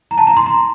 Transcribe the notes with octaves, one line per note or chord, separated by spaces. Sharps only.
A#5
A5
A#5
C6
A#5